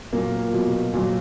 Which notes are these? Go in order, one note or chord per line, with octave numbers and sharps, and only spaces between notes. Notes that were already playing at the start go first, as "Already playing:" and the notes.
A#2 F#3 A#3
B2 F#3
A#2 F#3